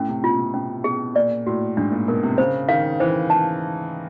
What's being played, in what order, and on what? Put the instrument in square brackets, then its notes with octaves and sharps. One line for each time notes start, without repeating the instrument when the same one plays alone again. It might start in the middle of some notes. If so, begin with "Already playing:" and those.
Already playing: [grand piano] A2 [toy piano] C#4
[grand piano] C3
[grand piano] B2 [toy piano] F4
[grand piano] C3
[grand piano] B2 [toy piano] C#4
[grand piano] B2 [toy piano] G#4
[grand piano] A#2 [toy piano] D5
[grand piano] A2 [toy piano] F#4
[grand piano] G#2 [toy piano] D4
[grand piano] A#2
[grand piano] B2 [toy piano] A#4
[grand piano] C3
[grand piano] C#3 [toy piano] C5
[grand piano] D#3 [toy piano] F5
[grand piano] E3 [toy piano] C5
[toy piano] A5